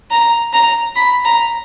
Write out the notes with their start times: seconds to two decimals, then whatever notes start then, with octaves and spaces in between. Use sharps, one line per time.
0.11 A#5
0.53 A#5
0.96 B5
1.25 A#5